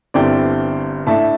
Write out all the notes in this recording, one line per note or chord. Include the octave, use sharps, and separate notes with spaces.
G1 G2 D3 C4 E4 D5 G5
A2 A3 D4 E5 A5